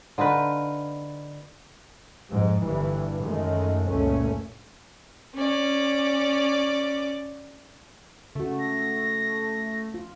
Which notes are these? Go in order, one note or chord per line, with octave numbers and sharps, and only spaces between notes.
D3 D#4 F4 B4
F2 G#2
G1 G2 E3
F#2 D#3 G#3 A3
F#1 C#2 A#2 A3 C#4
C#4 D5
C#3 A3 F#4
A#6
F4